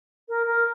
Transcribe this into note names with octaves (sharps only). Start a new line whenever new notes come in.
A#4
A#4